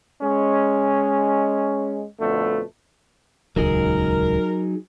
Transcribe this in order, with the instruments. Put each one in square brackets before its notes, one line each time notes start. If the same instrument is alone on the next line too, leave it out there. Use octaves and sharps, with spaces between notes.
[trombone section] G#3 C#4
F2 B2 D3 A3
[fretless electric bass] D#1 C#2 [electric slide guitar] F#3 D#4 G#4 [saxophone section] A#4